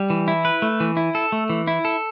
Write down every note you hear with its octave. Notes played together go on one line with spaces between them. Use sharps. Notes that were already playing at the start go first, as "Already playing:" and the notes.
Already playing: G3
E3
E4
B4
A3
E3
E4
A4
A3
E3
E4
A4